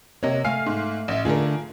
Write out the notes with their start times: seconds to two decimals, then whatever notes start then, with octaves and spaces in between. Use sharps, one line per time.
0.23 C3 A#3 C#5 D#5
0.45 A3 F5 G#5 F6 C7
0.66 G#2
1.08 A1 E5
1.25 D3 A3 F4 G#4 A#4